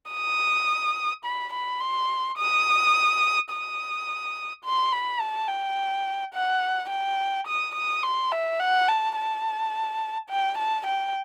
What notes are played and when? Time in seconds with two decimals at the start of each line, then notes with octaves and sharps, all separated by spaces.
0.12 D#6
1.25 B5
1.53 B5
1.81 C6
2.38 D#6
3.51 D#6
4.65 C6
4.93 B5
5.20 A5
5.48 G5
6.34 F#5
6.90 G5
7.48 D#6
7.75 D#6
8.03 C6
8.32 E5
8.60 F#5
8.89 A5
9.16 A5
10.30 G5
10.58 A5
10.87 G5